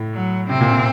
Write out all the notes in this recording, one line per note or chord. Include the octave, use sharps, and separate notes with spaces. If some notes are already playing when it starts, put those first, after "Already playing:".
Already playing: A2
F#3
C3 C4
A#2
C3